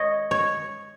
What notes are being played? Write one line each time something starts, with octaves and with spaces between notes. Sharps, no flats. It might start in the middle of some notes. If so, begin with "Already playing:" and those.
Already playing: C#5 D#5
C#5